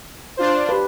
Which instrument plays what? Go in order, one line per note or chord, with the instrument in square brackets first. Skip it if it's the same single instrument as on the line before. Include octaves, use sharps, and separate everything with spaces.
[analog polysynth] D4 F4 C5
[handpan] G4 B4